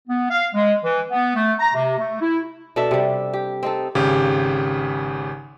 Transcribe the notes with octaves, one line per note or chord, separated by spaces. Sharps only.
B3
F5
G#3
E3
B3
A3
A#5
C3
A3
E4
B2 D4 A4 E5
C3 G3
G4
C4 D#4 A4
G#1 C#3 G4